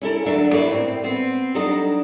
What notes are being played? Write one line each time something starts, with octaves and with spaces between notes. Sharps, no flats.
C#4 E4 A4 A#4
D2 D3 F#3 D4 E5
A#3 E4 B4 C#5 D5
A2 C4
B3 C4
F#3 G3 D4 D#4 A4 D#5